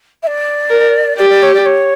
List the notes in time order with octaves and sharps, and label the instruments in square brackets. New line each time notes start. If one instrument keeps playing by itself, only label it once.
[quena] E5
D5
[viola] A#4
[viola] G4 [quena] D5
[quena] D5
C#5
D5
C#5